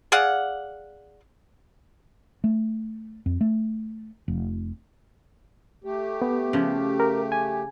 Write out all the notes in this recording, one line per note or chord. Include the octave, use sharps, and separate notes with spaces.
G#4 D5 F5 F#5
A3
F2
A3
F1
A3 G4
B3
C#3 F3
A#4
G#5